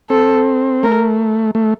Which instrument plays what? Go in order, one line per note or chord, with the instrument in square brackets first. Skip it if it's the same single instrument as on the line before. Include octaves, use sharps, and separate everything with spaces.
[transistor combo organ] C4 [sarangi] A4
[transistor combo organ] A3 [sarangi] A#4
[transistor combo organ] A3